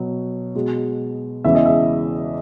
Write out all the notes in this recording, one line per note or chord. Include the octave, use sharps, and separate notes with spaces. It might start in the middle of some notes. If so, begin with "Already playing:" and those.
Already playing: B2 F#3
B2 G#3
E2 C#3 E3 G#3 E5
D#5
E5